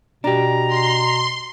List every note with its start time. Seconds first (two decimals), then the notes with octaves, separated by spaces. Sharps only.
0.24 B2 D4 G4 A#5
0.68 C6